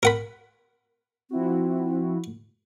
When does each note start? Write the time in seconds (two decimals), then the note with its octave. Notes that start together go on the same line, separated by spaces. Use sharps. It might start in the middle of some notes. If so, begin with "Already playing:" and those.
0.03 A#4 F#5 B5
1.31 F3 C4 E4 F#4